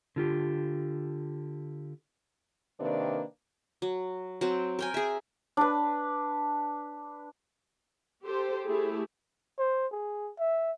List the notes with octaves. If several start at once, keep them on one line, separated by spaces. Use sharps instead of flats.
D3 F4 G4
C3 D#3 A#3 D4 B4 D5
F#3
F#3 C4
A#4 G5 G#5
G#4 E5
D4 B4
G4 A4 C5
A3 E4 G4 G#4
C5
G#4
E5